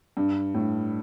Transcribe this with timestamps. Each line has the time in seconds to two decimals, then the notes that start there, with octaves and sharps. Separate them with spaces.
0.17 G2
0.54 A2